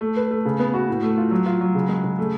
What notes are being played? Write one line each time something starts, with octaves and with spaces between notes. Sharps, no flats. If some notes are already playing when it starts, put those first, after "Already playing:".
A3
B4
A3
C#3
B3
F#4
A2
A3
F4
F#3
F4
F#3
C#3
G#3
C#3
A3